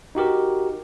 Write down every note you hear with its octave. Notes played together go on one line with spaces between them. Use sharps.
D#4 F#4 G4 A#4